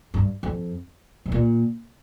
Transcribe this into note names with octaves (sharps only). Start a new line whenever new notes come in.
G2
F2
C3
A#2